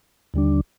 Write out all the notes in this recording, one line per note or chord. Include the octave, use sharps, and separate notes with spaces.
D#2 D3 G3 D4